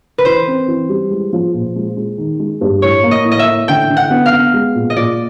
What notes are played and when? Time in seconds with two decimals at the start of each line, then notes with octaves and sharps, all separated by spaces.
0.18 B4
0.25 E3 C5
0.47 C4
0.68 E3
0.89 G3
1.11 G#3
1.33 F3
1.54 A#2
1.76 G#3
1.97 G#3
2.18 D#3
2.40 G#3
2.61 G2
2.82 A2 C#5
3.03 A#3
3.11 D#5
3.25 A2
3.32 D#5
3.39 E5
3.47 A2
3.68 D3 G5
3.89 D3
3.97 F#5
4.10 B3
4.26 F5
4.32 B3
4.54 G#3
4.75 A#2
4.90 D#5
4.96 A#2 D5